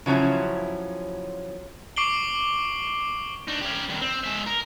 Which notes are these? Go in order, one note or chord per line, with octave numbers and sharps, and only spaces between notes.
C#3 F3 F#3 C#4 E4
C#6 D6 C7 D7 F#7 G7
D4 D#4
C#4 G4
G2 D#3
C4
G#3 E5
A#4